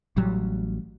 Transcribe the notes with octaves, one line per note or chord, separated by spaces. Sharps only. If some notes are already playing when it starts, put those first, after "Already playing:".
A1 A2 F#3 G3